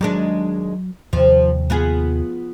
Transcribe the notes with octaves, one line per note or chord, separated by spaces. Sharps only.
D#2 F#3 G#3 D4
D#2 C3 F3
B3 F4 G#4